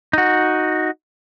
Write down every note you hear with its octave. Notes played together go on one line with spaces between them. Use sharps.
D#4 F#4